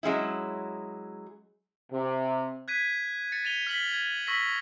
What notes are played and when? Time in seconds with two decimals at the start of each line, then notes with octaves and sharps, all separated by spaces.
0.03 F#3 G#3 C#4 E4
1.92 C3
2.68 F#6 G#6 B6 D#7
3.32 A6 C#7
3.45 A6 D#7 F7 G7
3.67 F6 B6 F#7 G7
3.94 G#6
4.27 C#6 E6 A#6 B6 F#7